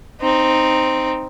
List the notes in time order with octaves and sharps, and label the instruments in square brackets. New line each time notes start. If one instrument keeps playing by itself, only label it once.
[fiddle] C4 D#4